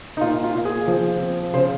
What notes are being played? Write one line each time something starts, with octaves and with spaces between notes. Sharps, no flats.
D#4
A#2 F4
F4
A#2
G#4
F3
C4
C#3 C5